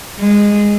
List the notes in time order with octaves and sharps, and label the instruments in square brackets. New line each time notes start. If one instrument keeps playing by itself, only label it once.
[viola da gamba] G#3